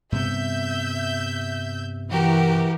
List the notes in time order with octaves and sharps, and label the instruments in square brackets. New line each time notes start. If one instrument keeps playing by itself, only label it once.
[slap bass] G2 C3 B3 [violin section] E5 G6
[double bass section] E3 [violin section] F#4 G4 A#4